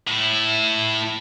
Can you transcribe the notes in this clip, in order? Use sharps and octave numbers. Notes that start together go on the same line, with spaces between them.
A2 E4